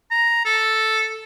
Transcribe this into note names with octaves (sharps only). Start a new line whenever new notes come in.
A#5
A4